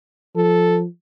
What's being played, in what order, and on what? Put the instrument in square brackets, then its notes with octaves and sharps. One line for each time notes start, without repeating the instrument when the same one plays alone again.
[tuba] F3 [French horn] A4